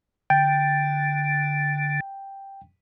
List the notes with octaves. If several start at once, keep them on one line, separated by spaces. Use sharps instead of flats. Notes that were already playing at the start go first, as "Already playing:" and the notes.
D3 G5